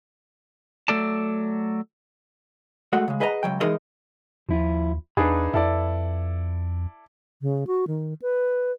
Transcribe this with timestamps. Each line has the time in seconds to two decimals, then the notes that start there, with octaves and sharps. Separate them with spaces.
0.88 F#3 A3 A4 D5 A5
2.93 G#3 A3 F#4 F#5
3.08 C#3 G#3
3.20 G#4 B4 D#5 F#5 G#5 A#5
3.43 C#2 F#3 G5
3.60 E3 G#3 D#4 G#4 A#4 D#5
4.49 D#2 F3 E4 F4
5.17 E2 D4 D#4 G#4 B4 F5 B5
5.54 F2 E4 A4 D5
7.42 C#3
7.67 F#4
7.87 D#3
8.22 B4